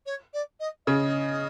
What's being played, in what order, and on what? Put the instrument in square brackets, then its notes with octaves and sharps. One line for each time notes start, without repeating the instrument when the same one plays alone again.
[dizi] C#5
D5
D#5
[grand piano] C#3 [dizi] D#5